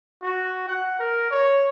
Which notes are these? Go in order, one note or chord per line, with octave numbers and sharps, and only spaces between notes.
F#4
F#5
A#4
C#5